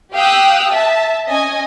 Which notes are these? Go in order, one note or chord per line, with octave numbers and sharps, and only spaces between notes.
G4 F5 G5 D#6 E6 F#6
E5 A5
C#4 D#5 G#5